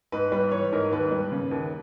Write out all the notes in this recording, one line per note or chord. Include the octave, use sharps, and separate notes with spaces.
G#2 B4
G3 B4
E3 C#5
G#2 A#4
D#2 B4
G3
C#3
D#2